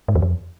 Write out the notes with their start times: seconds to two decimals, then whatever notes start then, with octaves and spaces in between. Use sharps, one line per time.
0.08 G#2
0.15 E2
0.22 F2